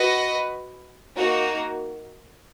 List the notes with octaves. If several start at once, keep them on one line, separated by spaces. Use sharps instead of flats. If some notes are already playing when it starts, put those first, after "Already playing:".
Already playing: F#4 B4 D#5
A#3 D#4 F#4